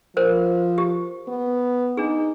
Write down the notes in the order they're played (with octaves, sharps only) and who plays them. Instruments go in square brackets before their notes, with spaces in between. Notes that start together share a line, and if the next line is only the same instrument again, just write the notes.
[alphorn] F3 [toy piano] A#4 C5
[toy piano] G4
[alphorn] B3
[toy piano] D4 G#4 [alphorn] D#4